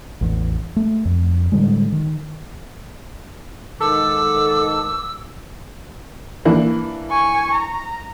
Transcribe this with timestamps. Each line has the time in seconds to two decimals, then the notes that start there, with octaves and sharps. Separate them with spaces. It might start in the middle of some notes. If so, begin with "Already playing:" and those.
0.21 A1 E2
0.76 A3
1.05 F2
1.52 A2 D3 G3 G#3
1.92 D#3
3.80 G#2 D#3 A4 D6 E6
6.45 E3 A#3 D4
7.11 G#5 C#6
7.55 A#5